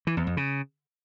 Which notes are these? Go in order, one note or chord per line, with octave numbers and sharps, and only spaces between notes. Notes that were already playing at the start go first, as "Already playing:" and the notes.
E3
E2
F2
C#3